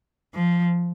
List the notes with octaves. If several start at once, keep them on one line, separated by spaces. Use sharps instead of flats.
F3